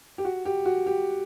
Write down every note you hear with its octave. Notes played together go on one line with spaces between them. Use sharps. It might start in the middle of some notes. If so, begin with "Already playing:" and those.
G4
F#4
G4
F#4
G4